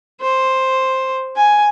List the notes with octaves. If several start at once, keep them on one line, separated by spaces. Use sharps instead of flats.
C5
G#5